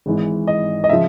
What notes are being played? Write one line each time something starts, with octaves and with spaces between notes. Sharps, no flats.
G#1 G#2 E3 G#3
D#5
D#5
C#3 F3 E5